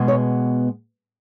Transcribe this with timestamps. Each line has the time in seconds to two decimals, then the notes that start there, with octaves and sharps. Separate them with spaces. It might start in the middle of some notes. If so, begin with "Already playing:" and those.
Already playing: B2 G#3 B3
0.08 C#5